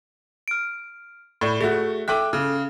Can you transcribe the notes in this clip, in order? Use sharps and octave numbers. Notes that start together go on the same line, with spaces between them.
F6 D7
A2 D5 B5
A3 F#4 G#4
A4 E5 G5 D6 F#6
C#3